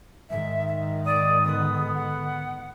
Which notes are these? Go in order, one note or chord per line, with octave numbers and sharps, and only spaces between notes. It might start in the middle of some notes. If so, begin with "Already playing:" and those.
G#2 D#3 E5
E5
D5 D#6
D3 B3 D#6
F#5